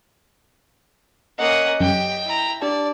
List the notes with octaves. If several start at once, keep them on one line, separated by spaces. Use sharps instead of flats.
A#3 C#4 D#5 F#5 D#6
F#2 G4 G5
E4 A#5
D4 G4 D5 A5